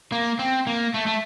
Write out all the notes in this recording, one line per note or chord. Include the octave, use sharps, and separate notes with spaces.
A#3
C4
A#3
A3
A3